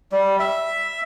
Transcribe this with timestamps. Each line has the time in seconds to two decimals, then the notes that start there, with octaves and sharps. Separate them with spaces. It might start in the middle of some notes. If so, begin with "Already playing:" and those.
0.12 G3
0.40 E5